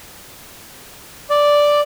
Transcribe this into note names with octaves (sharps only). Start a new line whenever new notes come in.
D5